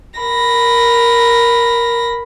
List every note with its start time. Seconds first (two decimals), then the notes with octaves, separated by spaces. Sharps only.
0.20 A#4 B5 A#6